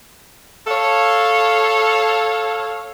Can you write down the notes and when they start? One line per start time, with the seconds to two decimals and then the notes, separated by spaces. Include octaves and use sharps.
0.67 A4 C#5 F5